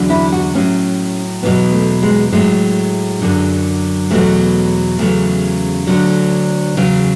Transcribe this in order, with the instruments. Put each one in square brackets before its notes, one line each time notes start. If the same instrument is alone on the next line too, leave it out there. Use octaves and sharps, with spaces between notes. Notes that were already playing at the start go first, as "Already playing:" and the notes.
Already playing: [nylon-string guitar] E2 D3 F#3
E4
F#4
A2 F#3 C#4
E2 B2 F#3 B3
A3
G#3
A2 F#3 G#3
F#2 D3 F#3
E2 B2 F#3 A3
E2 C#3 F#3 A3
D2 D3 F#3
E2 C#3 F#3